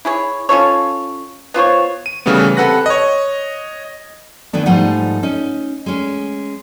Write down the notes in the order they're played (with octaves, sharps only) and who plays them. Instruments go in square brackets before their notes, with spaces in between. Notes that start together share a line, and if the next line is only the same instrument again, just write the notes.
[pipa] E4 G#4 C#5
C#4 F4 A4 C#5
B3 F4 C5 C#5
[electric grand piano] D#7
C#3 E3 G3 A3 B3
C3 A4 B4 F#5 F#6 A#6
C#5 D#5
[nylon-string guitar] D#3 E3 B3 D4
G#2 F3 G3 A3 D#4 F#5
C#4 D#4
G#3 C#4